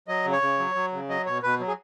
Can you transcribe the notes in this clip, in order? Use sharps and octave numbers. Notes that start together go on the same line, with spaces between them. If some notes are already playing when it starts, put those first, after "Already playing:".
F#3 D#5
C#3
C#5
C#3
F#3
F#3
C#3
F#3 D#5
B2 C#5
B2 B4
F#3
G#4